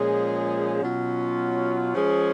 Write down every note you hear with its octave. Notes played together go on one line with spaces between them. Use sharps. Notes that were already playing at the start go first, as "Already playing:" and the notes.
Already playing: A#2 F3 G#3 C#4 G#4
B2 F#3 C#4 F4
F3 G#3 C#4 G#4